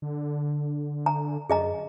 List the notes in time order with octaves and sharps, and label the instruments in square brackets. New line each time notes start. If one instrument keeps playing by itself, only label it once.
[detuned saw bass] D3
[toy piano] A#5
[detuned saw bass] F#2 [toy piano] G#4 D#5 A#5